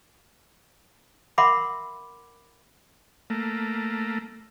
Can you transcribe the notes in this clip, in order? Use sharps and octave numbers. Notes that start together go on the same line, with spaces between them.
A#4 E5 F#5 B5 C6 D6
A3 A#3